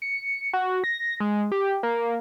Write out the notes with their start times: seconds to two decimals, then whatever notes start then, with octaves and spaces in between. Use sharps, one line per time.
0.02 C#7
0.53 F#4
0.84 A#6
1.20 G#3
1.52 G4
1.83 A#3